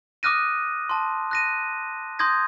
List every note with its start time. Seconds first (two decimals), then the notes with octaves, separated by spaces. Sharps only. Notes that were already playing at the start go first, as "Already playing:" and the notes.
0.23 D6 D#6 F6 F#6 A#6 D#7
0.89 A5 C6
1.31 F#6 A#6 D#7
2.19 C6 D#6 G6 G#6 A#6